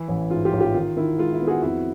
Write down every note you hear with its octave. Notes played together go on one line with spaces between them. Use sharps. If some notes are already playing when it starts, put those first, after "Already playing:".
Already playing: E3 E4
A1
G#2 F4
F4 G4
A1
F4 G4
D#3 F4
D#3 E4
G#3 F4
E4
B3
F#4 G#4
F2 E4 F#4